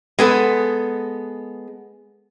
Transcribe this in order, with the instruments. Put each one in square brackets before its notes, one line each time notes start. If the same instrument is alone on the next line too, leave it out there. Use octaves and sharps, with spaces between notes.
[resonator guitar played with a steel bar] G#3 B3 A4